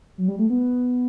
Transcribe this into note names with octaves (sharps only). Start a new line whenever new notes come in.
F#3
G3
A3
B3